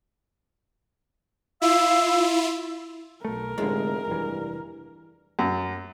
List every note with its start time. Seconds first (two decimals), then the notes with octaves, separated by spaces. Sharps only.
1.62 E4 F4 F5 E6
3.25 B1 A3 A#4
3.58 F1 A2 D3 G#3
4.08 F1 G2 E3
5.39 F#2